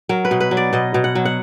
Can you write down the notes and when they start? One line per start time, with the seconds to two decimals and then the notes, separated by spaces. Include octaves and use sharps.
0.09 F#3 A#4
0.25 B4
0.31 B2
0.40 B4
0.51 F#3
0.57 D5
0.73 B2 D#5
0.94 B2
1.04 F#5
1.15 F#3
1.25 F#5